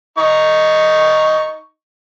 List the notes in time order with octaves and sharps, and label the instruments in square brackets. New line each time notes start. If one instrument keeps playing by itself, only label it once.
[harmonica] D#4 C#6